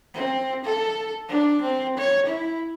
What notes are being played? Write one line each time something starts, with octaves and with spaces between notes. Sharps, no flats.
C4
A4
D4
C4
C#5
E4